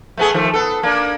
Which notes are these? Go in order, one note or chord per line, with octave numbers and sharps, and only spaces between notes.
A3 B3 G#4
D#3 F3 A3
B3 A4
A#3 D4